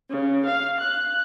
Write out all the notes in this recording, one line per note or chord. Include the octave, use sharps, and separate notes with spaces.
C#3
F5
F#6